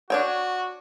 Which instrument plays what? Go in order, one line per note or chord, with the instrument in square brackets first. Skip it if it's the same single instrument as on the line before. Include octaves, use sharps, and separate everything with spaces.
[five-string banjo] D4 C#5 G5 [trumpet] F#4